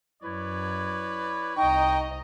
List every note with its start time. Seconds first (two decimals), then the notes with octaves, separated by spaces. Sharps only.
0.23 F#2 E4 B4 C#5 D5
1.57 C2 D#4 D#5 G5 A#5 C#6